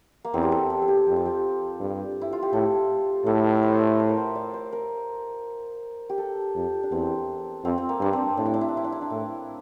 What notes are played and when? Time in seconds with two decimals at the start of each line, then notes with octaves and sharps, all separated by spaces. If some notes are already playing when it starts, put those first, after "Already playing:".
0.25 A#3
0.33 E2 C4
0.43 G4
0.52 A4
0.70 G4
0.82 A4
0.88 G4
1.07 F2 G4
1.16 F4
1.26 G4
1.80 G2
2.21 E4
2.33 F4
2.43 G4
2.53 A2 A4
3.26 A2 A4
3.63 C5
3.81 D5
4.00 C5
4.09 A#4
4.17 C5
4.35 D5
4.54 C5
4.73 A#4
6.10 G4
6.18 A4
6.55 F2
6.83 D4
6.91 E2 C4
7.64 F2 C4
7.78 C4
7.89 A#3
8.01 G2 D4
8.13 C4
8.37 A2 D4
8.46 E4
8.54 D4
8.61 E4
8.69 D4
8.77 E4
8.84 D4
8.92 E4
9.01 D4
9.10 A2 E4